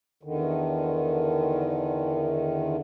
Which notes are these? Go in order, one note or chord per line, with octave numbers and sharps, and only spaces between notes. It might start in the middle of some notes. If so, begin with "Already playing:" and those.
E2 D3 D#3